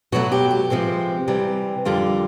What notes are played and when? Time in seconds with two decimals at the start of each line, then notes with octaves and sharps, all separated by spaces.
0.12 B2 F#3 A3 F#4
0.32 G4
0.51 G4
0.70 C3 F3 G#3 C4
1.28 C3 E3 G3
1.85 F2 D3 G3 A#3 F4